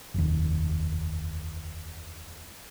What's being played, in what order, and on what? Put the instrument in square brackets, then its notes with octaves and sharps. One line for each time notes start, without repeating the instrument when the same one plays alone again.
[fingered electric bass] F1 D#2